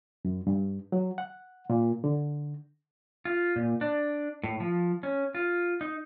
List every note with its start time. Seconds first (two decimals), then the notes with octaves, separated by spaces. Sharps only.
0.25 F#2
0.47 G2
0.92 F#3
1.18 F#5
1.70 A#2
2.04 D3
3.25 F4
3.56 A#2
3.81 D4
4.44 A2
4.60 F3
5.03 C#4
5.35 F4
5.81 D#4